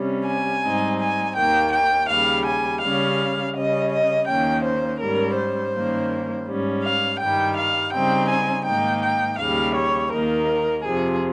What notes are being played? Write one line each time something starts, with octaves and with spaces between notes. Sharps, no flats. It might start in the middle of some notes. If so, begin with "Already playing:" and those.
Already playing: C3 G3 C#4
G#5
G#2 G3 C4 D#4
G#5
D#2 D#3 A#3 G5
G5
D#2 C#3 G3 F5
G#5
C#3 G3 C#4 F5
C#3 G3 C#4 D#5
D#5
D#2 D#3 A#3 C#4 G5
C5
G#2 G3 C#4 A#4
C5
G2 D#3 G3 A#3 C#4
G#2 G3 C#4
F5
G2 D#3 G3 G5
F5
C#3 G3 C4 D#4 G5
G#5
G#2 D#3 A#3 D#4 G5
G5
D#2 C#3 G3 F5
C#5
D#2 D#3 A#3 D#4 A#4
F2 C3 F3 G#4